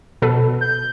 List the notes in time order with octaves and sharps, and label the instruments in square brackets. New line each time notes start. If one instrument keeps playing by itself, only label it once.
[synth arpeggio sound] B2 A4 B4
[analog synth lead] G6